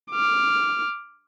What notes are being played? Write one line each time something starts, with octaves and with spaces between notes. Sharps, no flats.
D6 F6